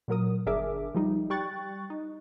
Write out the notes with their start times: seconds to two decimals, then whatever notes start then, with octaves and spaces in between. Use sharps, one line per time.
0.08 A#2 F#3 A#4 D#6
0.46 G1 D4 G#4 A#4 E5 D6
0.95 F3 G3 D#4
1.30 G3 G5 C#6 F#6 A6
1.90 D#4